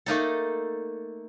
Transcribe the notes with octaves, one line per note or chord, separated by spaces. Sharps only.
A3 A#3 D#4 A4